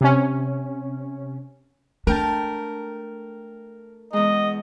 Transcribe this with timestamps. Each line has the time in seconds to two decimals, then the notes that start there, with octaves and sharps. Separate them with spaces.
0.01 C3 C#4
2.07 A3 D4 A#4 G5 A5
4.13 E2 G#3 D#5